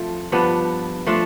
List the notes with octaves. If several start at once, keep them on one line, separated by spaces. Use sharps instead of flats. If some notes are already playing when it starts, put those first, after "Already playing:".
Already playing: F3 A3 C4
G2 F3 B3 D4
F3 A3 D4 F4